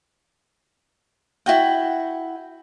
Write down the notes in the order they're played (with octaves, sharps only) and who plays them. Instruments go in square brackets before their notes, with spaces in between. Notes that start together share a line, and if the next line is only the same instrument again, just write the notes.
[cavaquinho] E4 F#4 G5